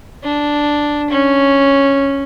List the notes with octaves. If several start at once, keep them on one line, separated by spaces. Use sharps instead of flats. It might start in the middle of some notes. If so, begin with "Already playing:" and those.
D4
C#4